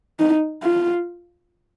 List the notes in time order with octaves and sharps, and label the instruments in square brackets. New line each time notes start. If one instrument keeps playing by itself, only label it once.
[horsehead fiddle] D#4
F4